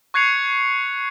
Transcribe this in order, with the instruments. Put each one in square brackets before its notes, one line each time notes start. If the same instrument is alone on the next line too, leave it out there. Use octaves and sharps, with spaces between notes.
[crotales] C#6 F#6 G#6 C7 C#7 F7